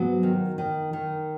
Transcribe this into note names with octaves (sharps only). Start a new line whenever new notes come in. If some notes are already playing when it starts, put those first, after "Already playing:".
Already playing: G#2 F#3 B3
D#3
D#3
D#3